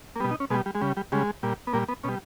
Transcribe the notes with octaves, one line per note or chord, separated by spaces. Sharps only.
A#3
B2 G3 B3
D#4
C#4
B2 G3 G#3
G3
G#3
C#3 G3
G3
C#3 G3 G#3
A#2 G3
B3
A#2 G3 A#3
B3
B2 G3 C#4